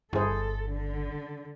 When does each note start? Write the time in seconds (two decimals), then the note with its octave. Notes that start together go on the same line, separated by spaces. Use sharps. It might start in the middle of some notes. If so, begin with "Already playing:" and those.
0.13 G1 E4 G#4 A4 C5
0.70 D3